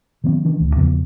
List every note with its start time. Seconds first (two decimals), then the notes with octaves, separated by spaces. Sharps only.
0.24 D#3 F#3 B3 C4
0.45 D#3 E3 D4
0.60 D#1 D2
0.76 E2 C#3 F3 B3